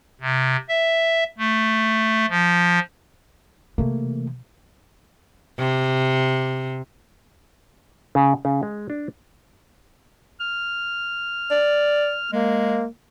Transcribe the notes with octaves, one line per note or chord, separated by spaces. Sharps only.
C3
E5
A3
F3
C3 E3 A3 A#3
C3
C#3
C#3
G#3
D4
F6
D5
G#3 A#3